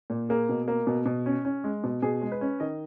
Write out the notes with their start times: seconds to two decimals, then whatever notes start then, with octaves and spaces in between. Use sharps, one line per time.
0.10 A#2
0.29 A#3 G#4
0.49 B2
0.68 A#3
0.87 B2
1.06 B2
1.26 C#4
1.45 C#4
1.64 G#3
1.84 B2
2.02 B2 G#4
2.22 G#3
2.32 B4
2.41 C#4
2.60 D#3 D#5